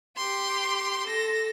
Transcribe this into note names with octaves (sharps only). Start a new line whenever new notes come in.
G4 C6
A4 A#6